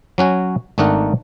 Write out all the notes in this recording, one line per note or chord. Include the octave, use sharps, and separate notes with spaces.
F#3 C#4 F#4 G#5
G#1 A3 D4 D#4 A#4 F#5